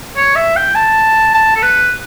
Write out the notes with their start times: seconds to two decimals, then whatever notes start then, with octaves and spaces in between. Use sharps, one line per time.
0.17 C#5
0.35 E5
0.56 G5
0.75 A5
1.34 A5
1.56 A4
1.63 B4